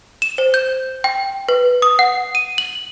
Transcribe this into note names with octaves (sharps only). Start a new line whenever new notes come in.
E7
C5
G6
G5
B4
D#6
F#5
D#7
F#7